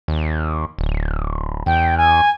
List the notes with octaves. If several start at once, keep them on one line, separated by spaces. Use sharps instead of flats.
D#2
D1
E2 G5
G#5